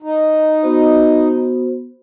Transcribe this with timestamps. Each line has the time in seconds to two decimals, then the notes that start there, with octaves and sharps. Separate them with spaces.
0.02 D#4
0.63 B3 F#4 C5